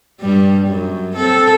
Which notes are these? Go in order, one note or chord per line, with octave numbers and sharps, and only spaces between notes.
G2 G3
F#2
C4 A4